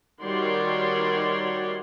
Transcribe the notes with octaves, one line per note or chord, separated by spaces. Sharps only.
D#3 G3 F#4 C#5 D5 C6